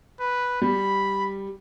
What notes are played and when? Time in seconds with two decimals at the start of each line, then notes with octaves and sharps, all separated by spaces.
0.20 B4
0.62 G3 B5